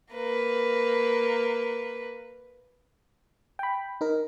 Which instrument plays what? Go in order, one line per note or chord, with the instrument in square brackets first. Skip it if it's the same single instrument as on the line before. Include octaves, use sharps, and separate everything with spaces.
[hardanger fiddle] A#3 B4
[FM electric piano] G5 B5
D#4 A#4